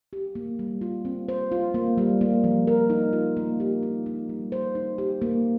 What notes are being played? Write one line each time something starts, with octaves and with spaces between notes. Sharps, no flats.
G4
A#3
G3
F4
C4
C5
F4
A#3
G3
A#3
F3
A#4
D#4
F4
A#3
G4
D#4
D#4
G3
C5
D#4
G4
A#3